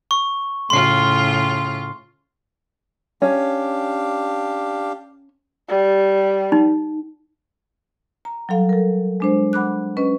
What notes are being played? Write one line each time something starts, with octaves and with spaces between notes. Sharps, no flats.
C#6
A2 C#3 F4 C6 C7
C#4 D4 G4 F5
G3
D#4
A#5
F#3 G3 A4 F5
A4 A#4
G#3 D4 C5
F#5 B5 D6 F#6
C#4 B4 D#5